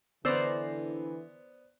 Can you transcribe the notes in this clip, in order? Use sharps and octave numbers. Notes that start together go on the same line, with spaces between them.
D3 E3 B3 C5 D5 A#5 E6